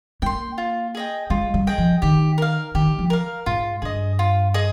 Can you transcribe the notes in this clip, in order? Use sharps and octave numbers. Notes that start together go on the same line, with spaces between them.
A#3 G5 C6
F4
G#4 D#5 G5
G#3 F4
G3
G#4 D#5 G5
F3
D#3 G4
A#4 F5
D#3 G4
F3
A#4 F5
G#2 F4
G2 G#4 D#5
F4
G#4 D#5